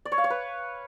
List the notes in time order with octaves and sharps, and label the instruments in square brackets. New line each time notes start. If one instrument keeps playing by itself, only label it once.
[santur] D5
C#5
F5
C#5
B4